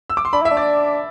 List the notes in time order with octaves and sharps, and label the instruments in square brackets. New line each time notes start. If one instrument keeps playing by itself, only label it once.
[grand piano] E6
D6
C6
[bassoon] D4 [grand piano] B5
[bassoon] E4 [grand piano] E5
[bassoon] D4
[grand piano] D5